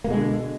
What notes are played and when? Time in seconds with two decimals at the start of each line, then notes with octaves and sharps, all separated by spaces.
0.04 A#3
0.07 B2
0.10 G#3
0.13 D3